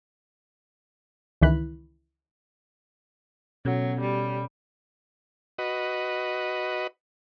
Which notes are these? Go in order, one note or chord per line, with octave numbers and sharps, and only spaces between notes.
C#2 D#3 E3 B5 F#6
B2 F#3 C#4 A4
G3
F#4 B4 D#5